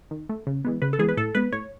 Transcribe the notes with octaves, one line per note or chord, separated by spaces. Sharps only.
D#3
A3
C#3
E3 G#3 B3
C#3 B4
A4
E3 G#3 B3 G#4
B4
A2 A4
G#3 B3 B4
A2 C#5